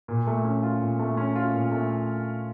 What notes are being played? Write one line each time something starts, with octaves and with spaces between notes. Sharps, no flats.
A#2
A3
C#4
F4
A#2
A3
C#4
F4
A#2
A3